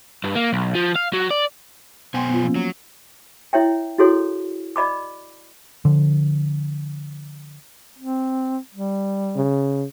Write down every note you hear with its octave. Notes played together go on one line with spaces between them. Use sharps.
G2
A#3
B1
F3
F5
F#3
D5
B2 B3 C5 G5 G#5 C6
B3 F4
F3 A#3 C#4
F#3
E4 C#5 E5 G5
E4 F#4 G#4 A4 C#5
D5 D#5 B5 D6
D3 F3
C4
G3
C#3